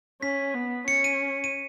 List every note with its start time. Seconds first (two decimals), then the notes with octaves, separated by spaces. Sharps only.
0.22 C#4 B6
0.54 B3
0.87 C#4 C#7
1.04 D#7
1.44 D#7